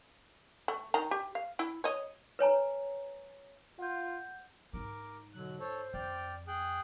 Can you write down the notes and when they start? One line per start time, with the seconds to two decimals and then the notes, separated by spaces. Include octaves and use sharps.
0.68 A3
0.94 D#3 A#5
1.11 G4
1.35 F5
1.59 E4
1.84 C#5 D#5
2.39 B4 C#5 G#5 A#5
3.79 F4 F#5 G6
4.73 G#2 D#4 A#4 D6
5.34 B2 D3 F#3 F#6
5.60 A4 C5 C#5
5.94 F2 D5 G5 F6
6.48 G#4 G5 F#6